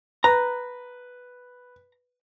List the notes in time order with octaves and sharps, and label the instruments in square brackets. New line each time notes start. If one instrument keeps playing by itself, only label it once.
[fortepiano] B4 [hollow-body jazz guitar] A#5